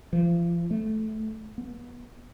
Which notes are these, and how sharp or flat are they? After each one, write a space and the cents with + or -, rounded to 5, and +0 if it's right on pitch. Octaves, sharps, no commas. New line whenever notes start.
F3 -35
A3 -10
B3 -30